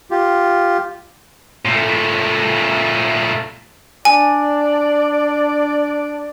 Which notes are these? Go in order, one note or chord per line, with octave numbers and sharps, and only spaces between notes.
F4 G4
A#2 A3
D4 D5 G#5